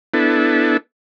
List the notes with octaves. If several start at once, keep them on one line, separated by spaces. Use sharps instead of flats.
B3 D4 E4 A4